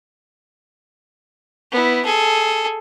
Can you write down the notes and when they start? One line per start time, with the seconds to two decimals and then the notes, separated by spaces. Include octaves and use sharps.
1.71 B3 E4
2.05 G#4 A4